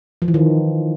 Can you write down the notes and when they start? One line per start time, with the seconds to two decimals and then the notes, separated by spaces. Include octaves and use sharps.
0.22 F3
0.28 E3
0.34 D#3